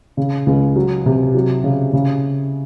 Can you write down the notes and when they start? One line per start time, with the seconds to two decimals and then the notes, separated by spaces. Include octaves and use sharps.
0.17 C#3
0.46 C#2
0.76 F#3
1.06 C3
1.35 F#3
1.64 C#3
1.93 C#3